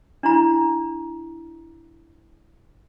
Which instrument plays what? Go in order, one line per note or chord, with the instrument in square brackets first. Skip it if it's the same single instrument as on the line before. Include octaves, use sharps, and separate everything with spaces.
[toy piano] D4 E4 A#5